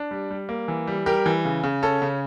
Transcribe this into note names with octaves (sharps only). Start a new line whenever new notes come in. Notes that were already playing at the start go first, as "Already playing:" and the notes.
Already playing: D4
G3
G3
A#3
E3
G3
G3 G4 A#4
E3
C#3
C#3
C#4 A4
C#3